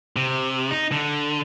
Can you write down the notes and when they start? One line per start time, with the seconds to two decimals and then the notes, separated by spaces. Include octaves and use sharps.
0.16 C3
0.71 D#4
0.92 D3